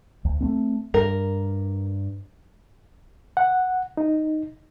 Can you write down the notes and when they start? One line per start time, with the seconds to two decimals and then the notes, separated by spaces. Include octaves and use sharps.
0.25 D2
0.41 A3 A#3 C4
0.94 G2 A#4
3.37 F#5
3.97 D#4